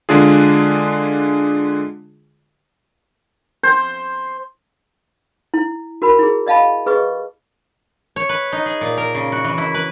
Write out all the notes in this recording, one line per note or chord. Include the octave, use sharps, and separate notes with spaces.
D3 G#3 D4 F4 G#4
C5
E4
F#4 A#4 B5
E4 G#4
D5 D#5 F5 A5 B5
G#4 B4 D#5 C#6
C#5
B4
D#4
G#4
A#2
A#4
C#3
F#4
E3
E4
B4